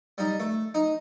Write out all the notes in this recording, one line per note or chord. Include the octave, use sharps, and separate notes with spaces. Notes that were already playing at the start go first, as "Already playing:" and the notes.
G3 D#4
A3
D#4